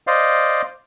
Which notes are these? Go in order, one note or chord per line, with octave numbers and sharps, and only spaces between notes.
C5 D5 D#5 F5